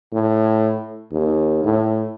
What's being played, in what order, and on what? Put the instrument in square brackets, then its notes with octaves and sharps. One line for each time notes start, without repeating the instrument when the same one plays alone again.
[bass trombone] A2
D#2
A2